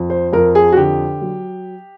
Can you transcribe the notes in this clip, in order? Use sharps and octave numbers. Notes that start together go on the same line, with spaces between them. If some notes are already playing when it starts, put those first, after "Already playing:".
Already playing: F2
C5
F2 A#4
G#4
F#4
D3 G4
F#3